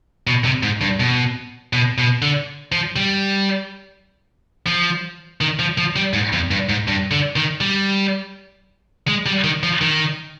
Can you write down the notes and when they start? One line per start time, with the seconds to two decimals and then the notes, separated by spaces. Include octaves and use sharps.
0.27 B2
0.45 C3
0.63 G#2
0.81 G2
1.00 B2
1.73 B2
1.98 B2
2.22 D3
2.72 F3
2.96 G3
4.67 F3
5.41 D#3
5.59 F3
5.78 F3
5.96 G3
6.13 G#2
6.33 F2
6.51 G2
6.69 G#2
6.88 G2
7.11 D3
7.36 D#3
7.61 G3
9.08 G#3
9.26 G3
9.44 D#3
9.63 F3
9.81 D#3